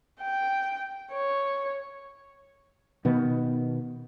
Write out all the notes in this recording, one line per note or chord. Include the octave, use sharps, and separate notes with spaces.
G5
C#5
B2 D#3 B3